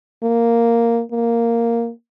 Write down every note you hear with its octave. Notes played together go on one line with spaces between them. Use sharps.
A#3
A#3